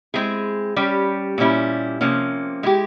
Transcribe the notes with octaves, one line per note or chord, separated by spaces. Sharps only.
G#3 C4 E4 G#4
G3 C#4 G4
A#2 G3 C#4 E4
C3 F3 A#3 C#4
G#3 E4 G4